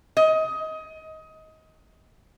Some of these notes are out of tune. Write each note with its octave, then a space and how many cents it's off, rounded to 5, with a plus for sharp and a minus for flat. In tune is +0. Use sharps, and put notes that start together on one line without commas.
D#5 +20